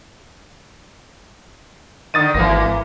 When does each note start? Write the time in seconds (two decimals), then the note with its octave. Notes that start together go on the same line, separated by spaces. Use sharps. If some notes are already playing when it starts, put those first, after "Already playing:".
2.14 D3 D#3 D#6 A6 D#7
2.34 G#1 E3 A#3 B3 A#6